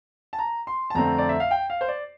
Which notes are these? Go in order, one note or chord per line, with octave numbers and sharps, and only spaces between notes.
A5
A#5
C6
A5
F2 D3 A3 C4 A#5
D5
E5
F5
G5
F5
C5
D5